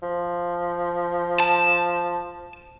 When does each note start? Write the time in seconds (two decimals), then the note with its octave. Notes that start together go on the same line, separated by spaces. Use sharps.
0.03 F3
1.40 A5